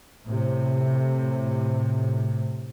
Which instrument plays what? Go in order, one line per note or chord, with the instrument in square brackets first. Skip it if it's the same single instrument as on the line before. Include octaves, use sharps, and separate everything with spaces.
[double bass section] A2 C3